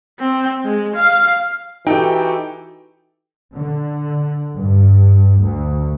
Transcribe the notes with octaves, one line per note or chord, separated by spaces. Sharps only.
C4
G#3
F5
E3 D#4 F#4 G4 A4 G5
D3
G2
D2